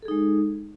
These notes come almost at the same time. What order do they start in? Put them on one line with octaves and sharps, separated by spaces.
A4 G#4 D#4 G#3